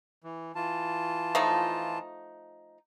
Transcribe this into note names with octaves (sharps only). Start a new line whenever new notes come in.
E3
E3 F4 A5
F3 A3 D#4